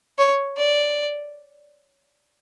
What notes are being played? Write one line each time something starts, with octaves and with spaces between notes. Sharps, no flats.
C#5
D5